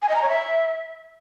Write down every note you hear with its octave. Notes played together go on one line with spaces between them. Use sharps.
G#5
D#5
A#5
C#5
E5